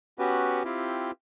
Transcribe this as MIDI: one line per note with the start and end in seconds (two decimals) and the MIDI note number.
0.19 0.63 59
0.19 0.63 61
0.19 0.63 66
0.19 0.63 67
0.19 0.63 71
0.65 1.11 60
0.65 1.11 64
0.65 1.11 65
0.65 1.11 67